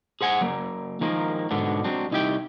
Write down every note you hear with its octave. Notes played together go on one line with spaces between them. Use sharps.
G#4 C5 F#5 G#5
F#3 A#3
D#3 F3 G#3 A#3
G#2 B2 D3 B3 D4
F#3 G#3 C4 D4
C2 D#4 E4 G4 G5